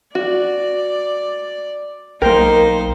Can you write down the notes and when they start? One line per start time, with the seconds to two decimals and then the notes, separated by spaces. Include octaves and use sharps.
0.15 F#4 D5
2.22 B1 A#3 D#4 A#4 C5 G5